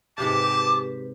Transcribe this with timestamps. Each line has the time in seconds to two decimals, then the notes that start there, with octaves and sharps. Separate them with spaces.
0.18 G#2 C3 G4 B4 F5 A5 D6